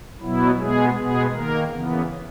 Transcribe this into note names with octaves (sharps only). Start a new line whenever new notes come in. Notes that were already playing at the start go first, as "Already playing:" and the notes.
B2 F#3 B3 E4
B2 G#3 B3 G#4
B2 G#3 B3 G#4
D#3 A#3 A#4
C#3 E3 B3